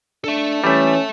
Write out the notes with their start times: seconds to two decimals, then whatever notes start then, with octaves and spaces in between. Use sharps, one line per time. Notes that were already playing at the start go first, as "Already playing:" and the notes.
0.24 D4 A4 E5
0.64 E3 G3 A3 C#4